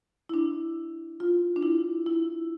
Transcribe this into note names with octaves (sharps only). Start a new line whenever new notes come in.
E4
D4
F4
D4
E4
E4